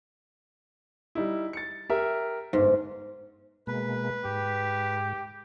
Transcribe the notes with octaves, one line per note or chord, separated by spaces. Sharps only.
G3 D#4 E4
A6 C#7
G4 A#4 E5
G1 G#2
B2 G#3 A#3 B4
G#2 G4